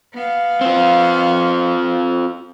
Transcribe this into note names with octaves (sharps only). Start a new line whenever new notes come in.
B3 F5
C4 F4